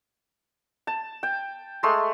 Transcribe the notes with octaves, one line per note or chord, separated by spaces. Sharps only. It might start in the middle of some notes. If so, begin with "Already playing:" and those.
A5
G5
G#3 A3 C6